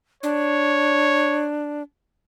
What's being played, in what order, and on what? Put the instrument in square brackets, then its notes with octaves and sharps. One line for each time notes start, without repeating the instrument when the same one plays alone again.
[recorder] D4 [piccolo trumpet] C#5